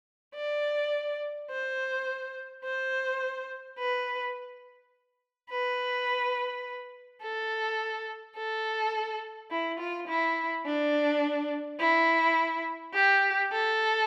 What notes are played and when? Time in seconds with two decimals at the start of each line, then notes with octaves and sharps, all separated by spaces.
0.35 D5
1.50 C5
2.64 C5
3.79 B4
5.50 B4
7.22 A4
8.36 A4
9.51 E4
9.80 F4
10.08 E4
10.66 D4
11.79 E4
12.94 G4
13.52 A4